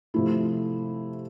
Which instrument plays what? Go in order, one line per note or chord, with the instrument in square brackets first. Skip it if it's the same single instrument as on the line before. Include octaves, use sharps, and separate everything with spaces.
[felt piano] C3 F3 A3 E4